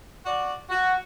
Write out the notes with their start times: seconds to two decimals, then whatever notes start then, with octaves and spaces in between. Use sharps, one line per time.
0.25 F#4 D5
0.69 F#4